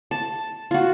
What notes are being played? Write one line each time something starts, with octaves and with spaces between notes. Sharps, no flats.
A5
F4 F#4